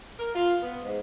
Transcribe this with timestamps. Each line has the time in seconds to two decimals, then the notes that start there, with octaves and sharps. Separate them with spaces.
0.18 A#4
0.33 F4
0.62 B3
0.82 G#2